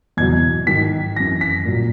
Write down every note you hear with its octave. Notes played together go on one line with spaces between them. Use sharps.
E2 B2 F#3 G#6
G#2 D#3 F#3 B6
F#2 E3 A#6
B6
A#2 F#3